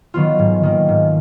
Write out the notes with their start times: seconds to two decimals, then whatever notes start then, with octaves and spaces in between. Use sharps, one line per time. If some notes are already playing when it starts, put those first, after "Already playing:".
0.14 D#3 F#3 B3 F4
0.39 G#2
0.63 D#3 A#3
0.89 G#2